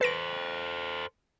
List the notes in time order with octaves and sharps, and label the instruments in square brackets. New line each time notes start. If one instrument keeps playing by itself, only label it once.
[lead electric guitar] A4 C5 [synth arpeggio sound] B4 A#6 D7